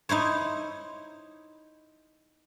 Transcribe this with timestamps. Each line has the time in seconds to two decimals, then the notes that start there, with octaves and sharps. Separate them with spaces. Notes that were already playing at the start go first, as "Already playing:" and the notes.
0.09 D#4 E4 C5 C#5